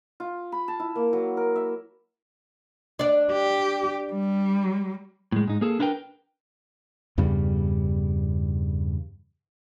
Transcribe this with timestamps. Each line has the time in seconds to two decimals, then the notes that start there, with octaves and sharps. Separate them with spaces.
0.20 F4
0.52 B5
0.68 A5
0.80 E4
0.95 A#3
1.13 F#3
1.37 A#4
1.56 E5
2.99 D4 D5
3.32 G4
4.12 G3
5.32 A2 G#3
5.48 G#2 D#4
5.61 A#3 G#4 A4
5.79 D4 E4 A#4 B4 G5
7.18 E2 G2 C#3 G3